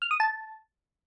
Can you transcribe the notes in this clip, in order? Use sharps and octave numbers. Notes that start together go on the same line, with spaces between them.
F6
D#6
A5